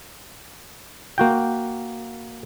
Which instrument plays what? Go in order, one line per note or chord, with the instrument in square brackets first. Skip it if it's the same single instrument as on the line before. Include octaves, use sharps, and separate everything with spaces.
[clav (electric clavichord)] A#3 F#4 G5